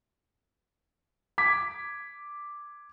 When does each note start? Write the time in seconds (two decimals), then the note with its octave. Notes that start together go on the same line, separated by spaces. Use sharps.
1.38 D6 G#6 B6